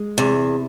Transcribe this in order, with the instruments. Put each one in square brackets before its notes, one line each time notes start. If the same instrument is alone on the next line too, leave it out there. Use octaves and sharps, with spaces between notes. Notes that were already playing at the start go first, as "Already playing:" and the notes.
Already playing: [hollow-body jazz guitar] G#3
[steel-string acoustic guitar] E2 [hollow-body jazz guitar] C3